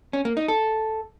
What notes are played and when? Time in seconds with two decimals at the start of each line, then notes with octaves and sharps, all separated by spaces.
0.13 C#4
0.25 A#3
0.37 D#4
0.48 A4